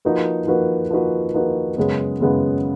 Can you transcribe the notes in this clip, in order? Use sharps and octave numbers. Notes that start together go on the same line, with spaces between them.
F3 A#3 D#4 F#4 B4
F3 A#3 D#4 F#4 B4
F3 A#3 D#4 F#4 B4
F3 A#3 D#4 F#4 B4
F#2 C#3 G#3 B3
F#2 C#3 G#3 B3